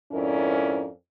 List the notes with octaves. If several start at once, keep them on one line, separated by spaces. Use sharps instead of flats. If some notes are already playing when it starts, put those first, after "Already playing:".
F2 G#2 C#4 E4 A#4 D5